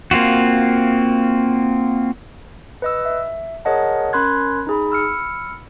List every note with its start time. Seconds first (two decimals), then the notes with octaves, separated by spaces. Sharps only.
0.11 A#3 C4 F4 F#4
2.82 B4 D#5 E6
3.05 E5
3.65 G#4 A#4 C#5 D#5 F#5 A5
4.13 C#4 A#4 B5 C6 F#6 G#6
4.67 D#4 G#4 B5
4.90 B5 E6 F6 C#7